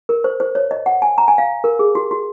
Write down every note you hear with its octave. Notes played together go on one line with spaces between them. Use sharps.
A#4
C5
C5
C#5
D#5
F#5
G#5
A#5
G#5
F5
A#4
G#4
F#4
F#4